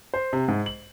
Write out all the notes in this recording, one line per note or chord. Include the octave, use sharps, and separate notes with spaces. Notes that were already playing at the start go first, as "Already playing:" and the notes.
C5
C3
G#2
F#7